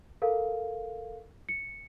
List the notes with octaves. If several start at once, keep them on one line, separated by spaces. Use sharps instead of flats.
A4 A#4 F5
C#7